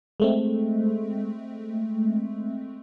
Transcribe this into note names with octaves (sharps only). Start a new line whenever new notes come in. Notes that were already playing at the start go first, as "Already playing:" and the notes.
G#3 A3 C4